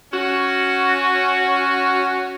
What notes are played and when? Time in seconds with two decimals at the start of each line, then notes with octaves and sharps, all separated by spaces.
0.12 C#4 F#4